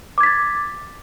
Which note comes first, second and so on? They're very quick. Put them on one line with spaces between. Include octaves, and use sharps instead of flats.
D6 G#6 B6 A6